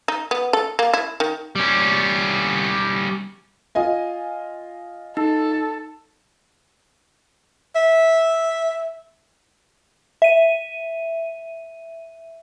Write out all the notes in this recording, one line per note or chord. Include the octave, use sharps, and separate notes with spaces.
D#4
B3
A4
A#3
E4
D#3
G3 C#4
F4 D#5 G#5
D#4 A4
E5
E5 D#7